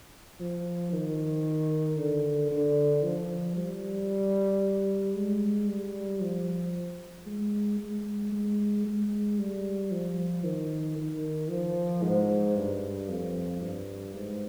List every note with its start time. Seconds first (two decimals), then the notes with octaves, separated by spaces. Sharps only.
0.39 F3
0.92 D#3
1.98 D3
2.51 D3
3.04 F3
3.56 G3
5.15 G#3
5.68 G3
6.21 F3
7.26 G#3
7.80 G#3
8.32 G#3
8.86 G#3
9.39 G3
9.91 F3
10.44 D#3
10.97 D#3
11.49 F3
12.02 G#2
12.56 G2
13.09 F2
13.61 G2
14.14 G#2